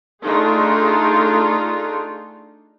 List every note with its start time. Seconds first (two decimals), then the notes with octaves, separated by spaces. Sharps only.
0.22 A3 D4 D#4 F4 G#4